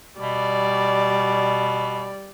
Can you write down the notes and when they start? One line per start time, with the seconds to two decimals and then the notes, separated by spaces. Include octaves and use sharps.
0.19 B2 G3 D5